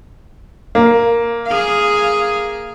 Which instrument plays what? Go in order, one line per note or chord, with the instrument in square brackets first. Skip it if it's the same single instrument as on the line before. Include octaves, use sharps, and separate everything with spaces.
[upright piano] A#3
[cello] G#4 F5